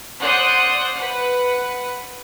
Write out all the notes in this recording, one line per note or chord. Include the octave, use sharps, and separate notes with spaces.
C5 D5 F#5 C6 D#6 F#6
B4 F#5